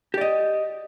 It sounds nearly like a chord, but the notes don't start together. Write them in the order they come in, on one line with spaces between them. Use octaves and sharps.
G4 D5 D#5